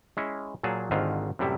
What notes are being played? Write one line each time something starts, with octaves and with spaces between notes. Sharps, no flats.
G#3 C#4 E4
A#2 F#3 G#4 A5
G#1 G#2 D3 D#3 F4
F#2 A2 C3 G3 E4